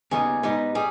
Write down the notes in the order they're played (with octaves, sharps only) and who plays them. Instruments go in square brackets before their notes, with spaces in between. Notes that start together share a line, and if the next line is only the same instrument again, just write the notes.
[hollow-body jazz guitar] D#2 C#3 G3 B3 D#4 [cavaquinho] G#4
[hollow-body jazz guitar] G#2 G3 B3 D#4
[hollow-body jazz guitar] G3 [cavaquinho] G#4